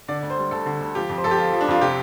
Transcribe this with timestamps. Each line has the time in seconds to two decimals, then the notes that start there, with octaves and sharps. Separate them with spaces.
0.08 D3 D5
0.23 D2
0.30 C5
0.38 G3
0.51 D2 A4
0.66 D3
0.80 D2
0.95 F3 G4
1.09 F2
1.18 C5
1.24 F2 A4
1.31 G4
1.38 F3 F4
1.53 F3
1.61 D4
1.68 F2 F4
1.81 C3 G4